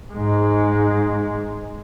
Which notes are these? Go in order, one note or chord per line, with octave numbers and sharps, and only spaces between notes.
G#2 G#3